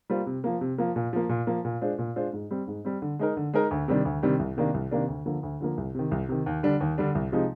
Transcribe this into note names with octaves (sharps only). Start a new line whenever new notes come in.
G3 A#3 F4 C5
C3
F3 A#3
C3
F3 A#3
A#2
F3 A#3
A#2
F3 A#3
A#2
G#3 D4 F4 C5
A#2
G#3 D4 F4 C5
G#2
G3 C4
G#2
G3 C4
D3
G#3 D#4 A#4
D3
G#3 D#4 A#4
D2
C3 D#3 G3 D4
D2
C3 D#3 G3 D4
C2
C3 D#3 A#3 D4
C2
C3 D#3 A#3 D4
D2
D3 F3 A#3
D2
D3 F3 A#3
C2
C3 D#3
C2
C3 D#3
D#2
D3 G3 D4
D#2
D3 G3 D4
C2
C3 F3 G#3 D#4